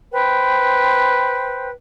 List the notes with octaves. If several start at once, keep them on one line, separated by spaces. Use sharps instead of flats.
B4 C5 G5